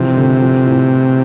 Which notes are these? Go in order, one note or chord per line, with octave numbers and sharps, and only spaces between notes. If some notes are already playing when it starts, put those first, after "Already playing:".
Already playing: C3 E3 F3
D3
F3
A2